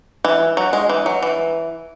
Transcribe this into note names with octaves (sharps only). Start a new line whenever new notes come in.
E3
F#3
G#3
E3
F#3
E3